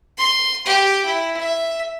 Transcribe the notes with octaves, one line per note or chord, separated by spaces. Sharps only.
C6
G4 G5
E4
E5